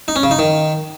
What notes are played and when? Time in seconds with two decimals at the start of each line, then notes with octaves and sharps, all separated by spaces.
0.08 D#4
0.16 C#4
0.23 C#3
0.31 D#4
0.39 D#3